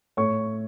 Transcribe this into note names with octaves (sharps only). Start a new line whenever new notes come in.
A2 C#5 C#6